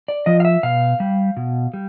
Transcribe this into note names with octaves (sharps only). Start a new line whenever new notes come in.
D5
F3 D#5
F5
E5
B2 F5
G3
B2
G3